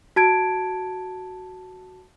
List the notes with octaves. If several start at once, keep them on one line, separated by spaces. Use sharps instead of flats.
F#4 A5 G#6 D7